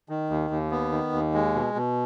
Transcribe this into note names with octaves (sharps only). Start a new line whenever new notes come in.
D#3
D#2
D#2
B3
D#3
D#2
G#3
B2
B2